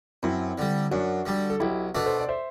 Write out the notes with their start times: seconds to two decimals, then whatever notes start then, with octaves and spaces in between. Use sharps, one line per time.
0.23 F#2 C4 E4
0.58 D3 G3
0.91 F#2 D4 F#4
1.26 D3 G3
1.50 A4
1.60 B1 E4 G4
1.95 B2 A3 D4
2.06 A4 C5
2.19 D5
2.29 C5 E5